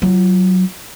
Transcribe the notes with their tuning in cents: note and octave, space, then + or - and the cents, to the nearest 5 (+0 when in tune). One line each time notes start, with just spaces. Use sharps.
F#3 +5 F4 -25